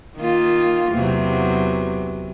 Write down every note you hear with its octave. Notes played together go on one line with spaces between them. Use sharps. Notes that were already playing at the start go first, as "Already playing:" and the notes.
D#3 A#3 F4
E2 C3 F#3